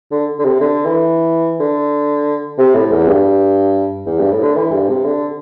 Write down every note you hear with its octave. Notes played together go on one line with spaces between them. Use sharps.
D3
D3
C3
D3
E3
D3
C3
A2
E2
G2
E2
G2
A2
D3
E3
G2
C3
D3